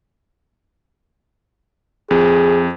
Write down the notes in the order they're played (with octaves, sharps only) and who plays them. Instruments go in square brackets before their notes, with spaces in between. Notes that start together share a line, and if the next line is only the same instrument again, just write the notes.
[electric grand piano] F2 [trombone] G#4